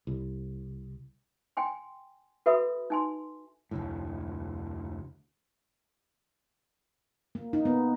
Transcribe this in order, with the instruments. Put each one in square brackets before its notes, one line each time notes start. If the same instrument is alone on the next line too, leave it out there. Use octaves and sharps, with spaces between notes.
[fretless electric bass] C2
[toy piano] G5 G#5 C6
F#4 A4 B4 E5 B5 D#6
D#4 G#5 C6
[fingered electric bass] F1 D2 A2
[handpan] A#3
D#4
B3